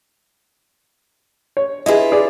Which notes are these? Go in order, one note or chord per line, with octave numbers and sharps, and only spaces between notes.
C#5
E4 F4 G#4 B4 D#5
G#4 D5